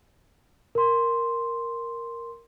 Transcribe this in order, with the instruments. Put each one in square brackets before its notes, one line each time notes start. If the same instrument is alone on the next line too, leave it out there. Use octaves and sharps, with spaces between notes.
[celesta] A#4 C6